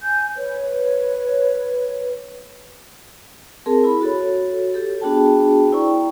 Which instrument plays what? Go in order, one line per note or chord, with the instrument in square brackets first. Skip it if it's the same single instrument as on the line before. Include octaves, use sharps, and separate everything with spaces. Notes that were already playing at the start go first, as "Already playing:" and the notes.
[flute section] G#5 G6
B4 C#5
[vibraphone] C4 G#4 A#4 A5
E4 B5
F#4 A4 C#5
G4 A4
B3 D4 F#4 G#4 G5 A5
E4 C5 D5 G5 A#5 C#6